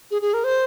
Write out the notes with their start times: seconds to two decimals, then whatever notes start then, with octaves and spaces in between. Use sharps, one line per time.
0.11 G#4
0.22 G#4
0.34 A#4
0.44 C5